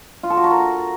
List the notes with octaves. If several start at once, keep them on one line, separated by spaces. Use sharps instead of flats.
F4
A4
F#4
A#5
A#4